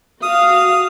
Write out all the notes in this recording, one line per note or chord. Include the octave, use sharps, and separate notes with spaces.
F#4 F5 D#6